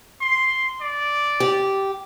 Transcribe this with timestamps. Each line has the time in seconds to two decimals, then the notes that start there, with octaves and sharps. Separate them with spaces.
0.21 C6
0.81 D5
1.40 G4